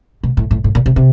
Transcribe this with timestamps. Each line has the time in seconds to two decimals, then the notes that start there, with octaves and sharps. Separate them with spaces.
0.23 B2
0.37 A2
0.51 A2
0.64 A2
0.75 A#2
0.86 C3
0.96 C3